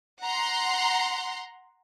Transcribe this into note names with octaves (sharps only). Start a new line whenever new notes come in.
F#5 A#5 C6